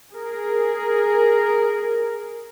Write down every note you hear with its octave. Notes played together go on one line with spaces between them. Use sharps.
G#4 A#4